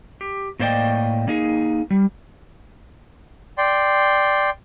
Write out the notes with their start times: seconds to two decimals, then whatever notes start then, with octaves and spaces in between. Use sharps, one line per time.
0.21 G4
0.59 A2 A#3 C5 D5 D#5 G5
1.28 A#3 D#4 G#4
1.90 G3
3.58 D5 G5 C6